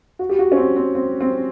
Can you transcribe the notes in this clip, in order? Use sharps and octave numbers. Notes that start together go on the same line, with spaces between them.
F#4
G4
F#4
C#4
C4
C4
C4
C4